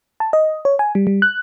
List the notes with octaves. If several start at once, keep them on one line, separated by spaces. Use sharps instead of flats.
A5
D#5
C#5
G#5
G3
G3
F#6